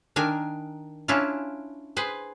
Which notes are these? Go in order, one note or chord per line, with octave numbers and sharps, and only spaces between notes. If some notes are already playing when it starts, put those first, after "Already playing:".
D#3 D4 A#4 G#5
C#4 D4 E4 F4
G#4 B4 C5